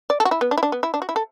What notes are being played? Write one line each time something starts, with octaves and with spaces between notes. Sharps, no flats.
D5
A4
F#4
E4
B3
D4
E4
D4
B3
E4
D4
F#4
E4
A4